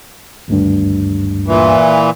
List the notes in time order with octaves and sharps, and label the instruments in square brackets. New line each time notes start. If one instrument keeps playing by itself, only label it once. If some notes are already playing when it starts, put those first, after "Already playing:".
[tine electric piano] G#1 D2 G2
[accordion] A#2 E3